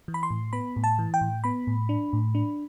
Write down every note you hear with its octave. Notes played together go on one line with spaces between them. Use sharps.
E3
B5
C6
A2
B3 B5
A2
A5
E3
G5
A2
B3 B5
A2
D4
A2
D4